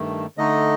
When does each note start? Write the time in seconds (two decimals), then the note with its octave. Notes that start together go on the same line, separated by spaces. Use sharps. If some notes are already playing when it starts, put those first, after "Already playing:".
Already playing: G2 D#3 A3
0.37 D3 A3 D#4 D#5